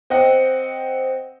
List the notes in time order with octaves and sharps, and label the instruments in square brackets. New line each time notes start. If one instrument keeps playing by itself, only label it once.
[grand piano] C4 D#5 F#5 G5